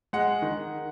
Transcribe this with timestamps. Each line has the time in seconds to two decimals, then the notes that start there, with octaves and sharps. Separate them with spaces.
0.13 G#3 F#5
0.42 D#3